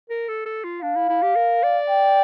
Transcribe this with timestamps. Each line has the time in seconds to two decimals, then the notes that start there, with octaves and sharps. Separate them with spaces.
0.09 A#4
0.28 A4
0.46 A4
0.64 F4
0.82 D4 F5
0.95 E4
1.09 E4
1.22 G4
1.35 A#4
1.63 D5
1.90 G5